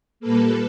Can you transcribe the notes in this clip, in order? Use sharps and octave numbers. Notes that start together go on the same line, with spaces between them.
A#2 G3 A#3 A4 B4